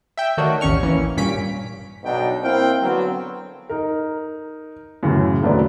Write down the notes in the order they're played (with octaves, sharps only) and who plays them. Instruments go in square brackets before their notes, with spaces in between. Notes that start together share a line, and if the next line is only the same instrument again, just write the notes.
[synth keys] E5 G5
D#3 A3 D4 F#4 A#4 C#5
A1 D#2 C#4 C#6 F6
E3 A#3 C#4
G2 A#2 C#4 B6 D7
[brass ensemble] B1 B2 F#3 D4 D#4 G5
A#3 C4 E4 F5 G5
D3 F#3 B3 C4
[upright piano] D#4 A#4
F#2 A2 C#3 E3
E1 D3 F#3 A3 B4 D5